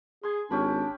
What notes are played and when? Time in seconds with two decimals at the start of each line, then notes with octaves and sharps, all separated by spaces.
0.23 G#4 G#5 C6
0.50 G#1 C#4 D4 G4 B5